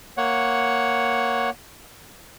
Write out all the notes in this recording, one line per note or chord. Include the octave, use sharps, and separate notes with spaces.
A#3 C#5 F#5